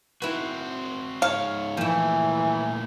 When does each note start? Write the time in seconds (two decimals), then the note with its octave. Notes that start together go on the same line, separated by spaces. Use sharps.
0.22 C4 E4 F#4 B4
1.22 G#2 C#5 F5
1.77 A#2 E3 F3 A3 E4